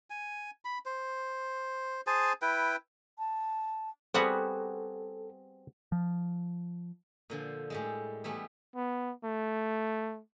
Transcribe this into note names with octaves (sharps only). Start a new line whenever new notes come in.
G#5
B5
C5
G#4 C5 G#5 A5
E4 B4 G5
A5
G3 B3 C4 F#4 G#4 A4
F3
A#2 D3 F3
A2 G3 G#3
E3 G3 A3 B3
B3
A3